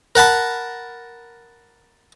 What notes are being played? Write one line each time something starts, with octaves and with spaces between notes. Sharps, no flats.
A#4 F#5 A5 B5